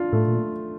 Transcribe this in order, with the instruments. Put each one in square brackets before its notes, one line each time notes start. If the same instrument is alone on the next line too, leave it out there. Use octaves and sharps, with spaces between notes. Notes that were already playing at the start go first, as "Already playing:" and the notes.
Already playing: [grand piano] D4 F4
[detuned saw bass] A2 [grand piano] A3
[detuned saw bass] A#2